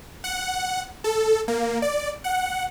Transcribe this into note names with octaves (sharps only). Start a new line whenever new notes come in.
F#5
A4
A#3
D5
F#5